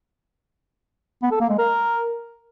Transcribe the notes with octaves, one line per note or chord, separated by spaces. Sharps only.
B3
A4
A#3
G#3
A#4